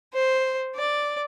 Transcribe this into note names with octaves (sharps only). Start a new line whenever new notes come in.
C5
D5